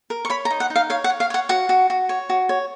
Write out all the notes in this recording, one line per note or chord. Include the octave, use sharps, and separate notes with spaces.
A#4
C#6
C#5 B5
A#5
D#4
F#5
D#4
F5
C#5 F5
F#5
C#5
F5
C#5 F#5
F#4 F#5
F#4
F#4
C#5
F#4
C#5